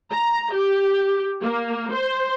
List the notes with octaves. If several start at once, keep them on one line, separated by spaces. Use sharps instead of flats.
A#5
G4
A#3
C5